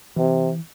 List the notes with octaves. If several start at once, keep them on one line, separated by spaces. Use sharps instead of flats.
C3 E3